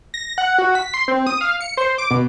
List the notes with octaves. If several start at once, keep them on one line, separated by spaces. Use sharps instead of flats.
A#6
F#5
F#4
B6
C6
C4
D#6
F5
C#7
C5
D6
B2